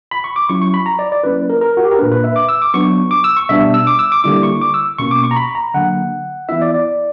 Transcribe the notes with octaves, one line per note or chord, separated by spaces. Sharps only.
B5
C#6
D6
F#3 C#4 E4 C#6
C#6
B5
A#5
D5
D5
F#3 A#3 C#4 E4 B4
A#4
A#4
F#4
G4
A#4
A#2 A#3 D4 B4
B4
E5
D6
E6
D6
F#3 B3 D4 C#6
D6
E6
C#6
B2 G3 B3 D4 E5
E6
D6
E6
D6
D3 G3 A#3 E4 D6
C#6
D6
E6
B2 A#3 C#4 C#6
D6
C#6
A#5
B5
A#5
D3 F#3 A#3 D4 F#5
E3 B3 E4 E5
D5
D5